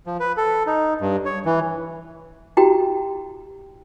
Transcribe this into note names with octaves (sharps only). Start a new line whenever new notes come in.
F3
B4
A4
D#4
G2
C#5
E3
E4 F#4 G4 G5 A#5